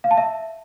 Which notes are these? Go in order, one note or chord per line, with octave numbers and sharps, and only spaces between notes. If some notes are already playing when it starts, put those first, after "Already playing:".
F5
A5
E5